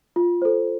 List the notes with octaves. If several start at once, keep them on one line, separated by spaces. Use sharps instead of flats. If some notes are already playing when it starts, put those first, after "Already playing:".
F4
A4 C5